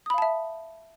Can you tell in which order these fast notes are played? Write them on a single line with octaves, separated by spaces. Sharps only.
D#6 B5 F5 A5 E5